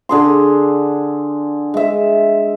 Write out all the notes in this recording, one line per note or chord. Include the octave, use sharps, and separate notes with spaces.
D3 G#4 C6
G#3 E5